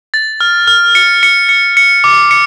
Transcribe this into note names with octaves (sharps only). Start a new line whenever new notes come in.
A6
F6
F6
C#7
C#7
C#7
C#7
D6
C#7